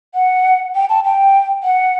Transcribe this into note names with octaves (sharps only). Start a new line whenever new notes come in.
F#5
G5
A5
G5
F#5